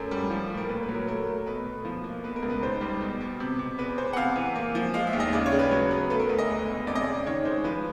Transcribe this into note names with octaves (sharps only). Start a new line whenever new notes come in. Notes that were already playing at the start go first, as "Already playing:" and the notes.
Already playing: F#2 A3 A#4
G3
F3
A2
A#4
A#2 B4
B4
F#3
A#4
A3 A#4
A3
B2 B4
B2
F3
A#3
B2 B4
A#4
C#2
B4
G#2 C5
G3
B2
B2
C3
C3
E2 B4
E2 C5
F#5
C3 F5
E3
A#3
F3
G#3 F5
E5
D#2
D#5
C#3 D5
C#5
C#3
B4
F#3
B3
A3 B4
A#4
D2 B4
D#5
G#3
B2
F2 D5
D#5
C#3 D5
D#3 C#5
G#3 C5
F3 B4